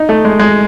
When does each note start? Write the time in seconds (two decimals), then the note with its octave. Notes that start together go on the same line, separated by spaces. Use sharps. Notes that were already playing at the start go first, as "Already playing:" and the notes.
Already playing: D#4
0.09 A3
0.25 G#3
0.39 G#3